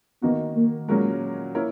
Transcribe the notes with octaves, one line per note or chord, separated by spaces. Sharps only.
D#3 A#3 B3 D#4 F#4
A#3
A#2 F#3 G#3 C#4 F#4 A#4
A#3 E4 A#4 C#5